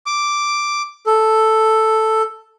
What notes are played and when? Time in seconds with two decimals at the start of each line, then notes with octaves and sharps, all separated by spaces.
0.06 D6
1.06 A4